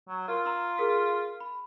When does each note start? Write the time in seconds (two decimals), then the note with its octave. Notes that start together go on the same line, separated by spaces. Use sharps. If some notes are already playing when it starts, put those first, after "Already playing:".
0.09 F#3
0.28 F4 A#4
0.45 A#5 C6 E6
0.78 G#4 A#4 B6
1.40 B5